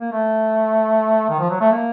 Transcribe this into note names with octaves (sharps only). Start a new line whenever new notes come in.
A#3
A3
D#3
F3
F#3
A3
A#3